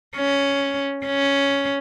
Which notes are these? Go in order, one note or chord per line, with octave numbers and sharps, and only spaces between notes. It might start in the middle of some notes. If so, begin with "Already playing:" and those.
C#4
C#4